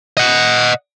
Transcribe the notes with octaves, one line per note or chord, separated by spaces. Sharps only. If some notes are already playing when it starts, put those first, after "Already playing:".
D#5 F#5